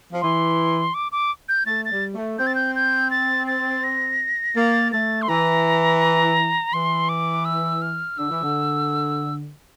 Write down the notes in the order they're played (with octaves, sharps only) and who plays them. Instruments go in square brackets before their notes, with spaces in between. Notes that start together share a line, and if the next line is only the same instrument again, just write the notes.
[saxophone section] F3
[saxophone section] E3 [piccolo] C6
[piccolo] D6
D6
G6
[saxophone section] A3 [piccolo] A6
[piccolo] A6
[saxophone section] G3
A3
[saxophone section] C4 [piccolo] G6
[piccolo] A6
G6
G6
A6
A6
A#6
[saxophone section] A#3 [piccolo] A6
[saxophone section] A3 [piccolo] A6
[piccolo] C6
[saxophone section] E3 [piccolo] A#5
[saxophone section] E3 [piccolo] C6
[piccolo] D6
E6
F6
[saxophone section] D3 [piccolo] E6
[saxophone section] E3
D3